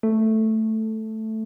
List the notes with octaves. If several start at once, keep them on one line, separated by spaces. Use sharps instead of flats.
A3